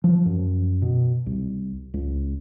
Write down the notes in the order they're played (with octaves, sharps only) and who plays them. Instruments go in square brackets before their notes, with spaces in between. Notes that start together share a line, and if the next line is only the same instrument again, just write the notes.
[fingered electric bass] F3
F#2
B2
C2
C#2